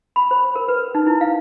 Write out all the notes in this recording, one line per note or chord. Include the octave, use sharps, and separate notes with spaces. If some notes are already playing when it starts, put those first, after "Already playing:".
B5
C5
A#4
B4
D#4
E4
F5